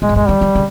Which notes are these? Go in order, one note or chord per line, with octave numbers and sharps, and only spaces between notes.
G2 G#3
G#2
G2 G#3
D#3 G3
D#3
C#3